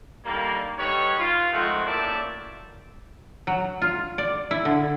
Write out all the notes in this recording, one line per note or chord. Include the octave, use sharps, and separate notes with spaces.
D3 D#3 G3 A#3
D3 G3 D#4 B4 C#5
F4
D#3 F3 G#3 A3 C4 F#4
F#2 A2 A#3 D5 E5 A5
F#3
F4
D5
E4
D3